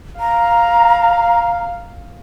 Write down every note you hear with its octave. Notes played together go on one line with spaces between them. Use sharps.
F5 A#5